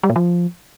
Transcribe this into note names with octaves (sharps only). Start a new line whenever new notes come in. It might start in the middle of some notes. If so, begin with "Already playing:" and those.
G3
A#2
F3